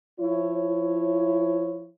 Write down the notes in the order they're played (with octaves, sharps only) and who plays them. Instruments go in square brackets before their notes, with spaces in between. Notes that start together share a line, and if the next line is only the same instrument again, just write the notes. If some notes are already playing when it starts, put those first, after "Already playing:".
[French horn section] F3 E4 C#5